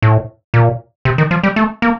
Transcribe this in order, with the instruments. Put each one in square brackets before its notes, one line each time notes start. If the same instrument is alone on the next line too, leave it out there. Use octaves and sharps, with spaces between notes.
[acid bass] A2
A#2
C3
D#3
F3
G3
A3
A#3